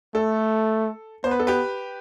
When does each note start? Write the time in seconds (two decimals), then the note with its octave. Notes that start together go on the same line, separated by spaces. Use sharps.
0.15 A3 A4
1.24 B3 C5
1.31 B4
1.40 A4
1.47 G4 B4